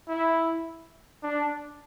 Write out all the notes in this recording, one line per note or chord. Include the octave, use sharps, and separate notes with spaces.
E4
D4